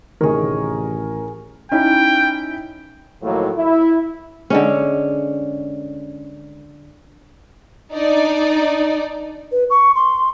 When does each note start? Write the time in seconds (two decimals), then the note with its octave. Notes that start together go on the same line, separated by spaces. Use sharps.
0.21 A1 D2 C3 D#3 G#4 A#4 C#5
1.72 C#4 D#4 E4 G5
3.22 A2 D#3 F3 F#3 A#3
3.56 E4
4.50 D3 G#3 C#4
7.93 D4 D#4 D5
9.52 B4
9.70 C#6
9.95 C6